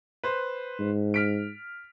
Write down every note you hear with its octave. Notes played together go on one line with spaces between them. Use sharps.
B4 C5
G#2
F6 B6 D7